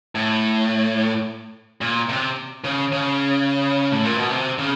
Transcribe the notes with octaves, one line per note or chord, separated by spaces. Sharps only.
A2
A#2
C3
C#3
C#3
A2
A#2
B2
C3
C#3